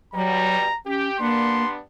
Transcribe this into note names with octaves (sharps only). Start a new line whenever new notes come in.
B2 F#3 G3 A#5
C#4 G4
G3 A#3 B3 D4 C6